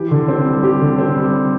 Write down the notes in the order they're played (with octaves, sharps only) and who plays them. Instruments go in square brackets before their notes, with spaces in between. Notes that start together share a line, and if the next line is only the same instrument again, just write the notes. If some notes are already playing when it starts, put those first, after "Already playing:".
Already playing: [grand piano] E3 G4
D3
C4
G3
G4
D3
C4
G3